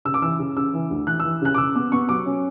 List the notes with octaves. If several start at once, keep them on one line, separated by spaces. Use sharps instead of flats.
C#3 E6
D6
E3 E6
C#3
C#3 E6
E3
D2
E3 F#6
E6
E3
C#3 F#6
D6
C#3 E6
B3 D6
B3 C#6
F#3 D6
C#4